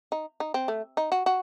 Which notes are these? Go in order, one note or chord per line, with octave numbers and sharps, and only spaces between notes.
D#4
D#4
C4
A3
D#4
F#4
F#4